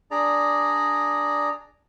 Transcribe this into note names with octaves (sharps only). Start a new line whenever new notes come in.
D4 G#4 D5 A#5